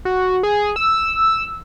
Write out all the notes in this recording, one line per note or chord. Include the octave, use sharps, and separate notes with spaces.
F#4
G#4
E6